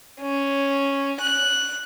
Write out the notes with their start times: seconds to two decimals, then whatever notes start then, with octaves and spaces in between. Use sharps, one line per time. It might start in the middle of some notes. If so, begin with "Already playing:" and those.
0.22 C#4
1.21 F#6